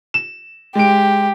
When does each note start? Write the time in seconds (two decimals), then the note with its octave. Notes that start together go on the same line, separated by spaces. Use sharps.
0.14 E7
0.75 G#3 G4 D7